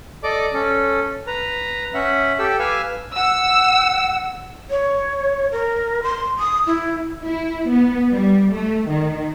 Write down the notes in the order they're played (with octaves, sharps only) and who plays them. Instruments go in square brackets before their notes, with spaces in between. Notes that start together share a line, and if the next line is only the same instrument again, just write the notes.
[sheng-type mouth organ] A4 D5 D#5 D6
C#4 A4
B4 A#5
C#4 E5 F#5
G4 A4 G5 E6
B4 F5 G#5 E6
[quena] F#5 [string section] E6
[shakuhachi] C#5
A#4
C6
D#6
E4
[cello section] E4
B3
G3
A3
D#3